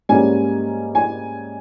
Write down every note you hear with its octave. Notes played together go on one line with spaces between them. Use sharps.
G#2 G3 A#3 C#4 G#5
G#5